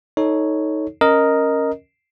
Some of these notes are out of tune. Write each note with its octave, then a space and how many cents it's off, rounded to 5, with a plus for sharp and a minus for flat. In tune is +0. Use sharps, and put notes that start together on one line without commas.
D#4 +15 A4 +0 C#5 +0
C#4 -10 A#4 +0 D#5 +0